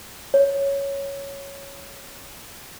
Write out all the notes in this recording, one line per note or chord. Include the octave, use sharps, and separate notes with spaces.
C#5